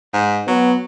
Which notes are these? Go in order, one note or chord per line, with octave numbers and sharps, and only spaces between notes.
G#2
F#3 B3